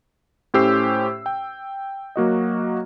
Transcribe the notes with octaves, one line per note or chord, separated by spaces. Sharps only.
A2 C#4 G4 C5 E6 C7
G5
F#3 A#3 F#4 D#5